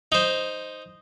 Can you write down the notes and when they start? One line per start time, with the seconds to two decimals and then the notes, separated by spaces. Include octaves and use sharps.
0.12 D#4 C5